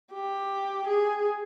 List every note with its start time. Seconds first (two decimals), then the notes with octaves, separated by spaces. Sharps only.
0.13 G4
0.87 G#4